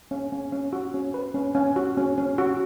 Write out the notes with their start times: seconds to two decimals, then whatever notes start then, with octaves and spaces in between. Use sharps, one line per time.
0.11 C#4
0.32 C#4
0.53 C#4
0.73 F#4
0.94 C#4
1.14 B4
1.34 C#4
1.55 C#4
1.76 F#4
1.97 C#4
2.18 C#4
2.38 F#4